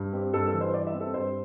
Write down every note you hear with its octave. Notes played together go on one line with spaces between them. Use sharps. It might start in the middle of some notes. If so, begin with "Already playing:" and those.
Already playing: G2
C4 G4
G2 A4
A4
E3
C5
G2 D5
E5
C4
A4
G2 C5